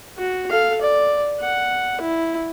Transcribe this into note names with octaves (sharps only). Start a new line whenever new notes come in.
F#4
A4 F5
D5
F#5
E4